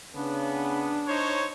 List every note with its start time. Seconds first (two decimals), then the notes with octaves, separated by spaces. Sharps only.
0.15 C#3 B3 D4
1.08 D#4 C5 C#5